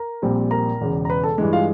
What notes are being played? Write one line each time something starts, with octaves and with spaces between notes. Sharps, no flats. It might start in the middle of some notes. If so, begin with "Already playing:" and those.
Already playing: A#4 A#5
A#1 A#2 G3 C4
A#4 A#5
E1 E2 C#3
A#5
B4 B5
A4 A5
G2 E3 G#3
F4 F5